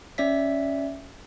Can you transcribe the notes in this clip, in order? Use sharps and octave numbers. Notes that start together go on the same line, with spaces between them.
C#4 D5 E5 B6